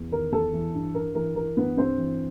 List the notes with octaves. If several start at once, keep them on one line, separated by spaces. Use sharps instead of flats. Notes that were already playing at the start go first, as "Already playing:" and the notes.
Already playing: E2
D#3 A#4
E2 A4
E3
G2
G2 A#4
E3 A#4
E3 A#4
G2 B3 B4
G2 C4 C5
E3